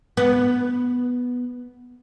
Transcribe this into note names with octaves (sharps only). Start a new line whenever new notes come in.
B3